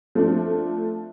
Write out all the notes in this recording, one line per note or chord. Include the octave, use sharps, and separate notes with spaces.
F3 A3 C4 D4